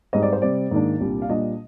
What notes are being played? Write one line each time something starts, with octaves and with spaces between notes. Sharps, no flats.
G#2 G3 C4 D#5
D5
C5
C3 G3 C4 D5
G#2 D#3 A#3 D4
C2 A#2 G3 D4
F5
A#2 G3 D4 D#5